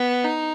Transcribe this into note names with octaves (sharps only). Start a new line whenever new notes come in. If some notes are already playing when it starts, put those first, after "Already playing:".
Already playing: B3
D#4